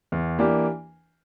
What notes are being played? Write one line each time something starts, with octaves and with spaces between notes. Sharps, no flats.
E2
E3 A#3 D4 G4